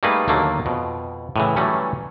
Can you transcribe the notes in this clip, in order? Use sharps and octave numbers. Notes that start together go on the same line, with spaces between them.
G3 A3 A#3 D#4 G#4 B4
D#2 D3 F#3 A3 A#3
F2 B2
A2 C#3 E3
E3 F#3 G3 A3 C#4